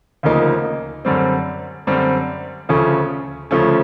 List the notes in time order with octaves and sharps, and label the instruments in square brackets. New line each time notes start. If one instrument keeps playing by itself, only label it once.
[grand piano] D2 C#3 F3 A#3 D#4
F#2 D3 G3 C4
F#2 D3 G3 C4
D2 C#3 F3 A3 C#4
D2 C#3 F3 A3 C#4